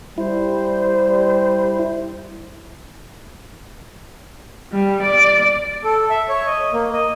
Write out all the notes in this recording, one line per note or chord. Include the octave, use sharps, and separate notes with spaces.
G3 E4 C5
G3
D5
A4
E5
C#5
D#5
A#3
D#5